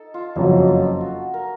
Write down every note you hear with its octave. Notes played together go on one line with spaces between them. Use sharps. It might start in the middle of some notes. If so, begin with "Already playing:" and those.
Already playing: D#4 A4
F4
F#1 F2 C#3 F#3 D#4
F4
F#4
A#4